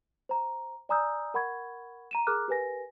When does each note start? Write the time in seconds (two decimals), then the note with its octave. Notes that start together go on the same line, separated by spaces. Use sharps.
0.29 C5 A#5
0.89 D5 G#5 A#5 D#6 E6 G6
1.34 A#4 F#5 B5 C#6 G#6
2.11 A#5 D#7 E7
2.27 G#4 A#4 A#5 D6 F6 F#6
2.48 G4 A#4 B4 G#5 A#6